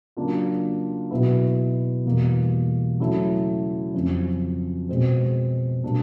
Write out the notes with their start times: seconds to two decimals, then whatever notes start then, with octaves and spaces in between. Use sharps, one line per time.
0.17 C#3 F#3 A#3 D4 F4
1.11 B2 F#3 B3 E4
2.05 E2 B2 G3 A#3
3.00 C#3 F#3 A3 C#4 E4
3.95 F2 C#3 F#3
4.89 B2 G#3 C4
5.83 B2 G3 A#3 D4